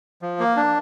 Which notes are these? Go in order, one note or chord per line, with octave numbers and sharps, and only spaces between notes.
F3
A#3
D4